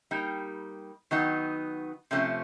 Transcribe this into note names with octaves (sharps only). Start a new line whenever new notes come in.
G3 A#3 D#4
D#3 F#3 B3 D#4
C3 F3 A3 C#4